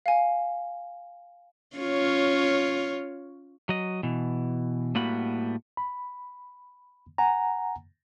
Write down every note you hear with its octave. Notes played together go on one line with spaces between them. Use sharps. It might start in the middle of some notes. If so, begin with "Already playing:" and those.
F5 G#5
C#4 F4 C#5
F#3 D#5
B2 E3
A2 G3 A#3 B3 F#4 B5
B5
F#5 G#5 A#5